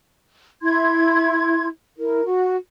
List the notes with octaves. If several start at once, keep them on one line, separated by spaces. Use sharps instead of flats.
E4 C6 G#6
E4 A#4
F#4